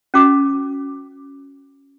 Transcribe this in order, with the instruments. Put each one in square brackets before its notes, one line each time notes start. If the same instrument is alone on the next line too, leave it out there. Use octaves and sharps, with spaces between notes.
[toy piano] C#4 F#4 D6